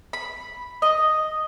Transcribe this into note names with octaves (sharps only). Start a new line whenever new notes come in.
B5
D#5